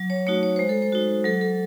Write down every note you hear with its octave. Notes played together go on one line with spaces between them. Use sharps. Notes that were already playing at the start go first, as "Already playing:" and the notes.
Already playing: F#3
C#5
A3 D#4 F#4 C#5
C#5
G#3 C5
A4
C5
D#4 F#4
F#3 A4
A4